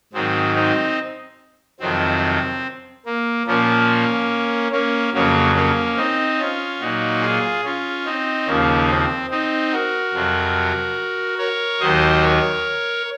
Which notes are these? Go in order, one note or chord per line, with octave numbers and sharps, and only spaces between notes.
G#2 D#3 F#3 C4
C4 D#4
F2 C3 D#3 F#3 C4
A#3
A#2 F3 A#3 C#4
A#3 C#4
F2 C#3 F#3 A#3 C#4
A#3 C#4
C4 D#4
C#4 F4
A#2 F#3 D#4 F#4
F4 G#4
C#4 F4
C4 D#4
D#2 C#3 F3 A#3 C#4
C4
C4 D#4
F#4 A#4
F2 C3 F#3
A#4 C#5
D#2 D#3 F#3 C5 D#5
A#4 C#5